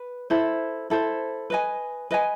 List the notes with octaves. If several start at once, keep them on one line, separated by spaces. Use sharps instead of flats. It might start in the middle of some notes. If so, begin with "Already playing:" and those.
Already playing: B4
E4 A4 C5
E4 A4 C5
B4 D#5 G#5
B4 D#5 G#5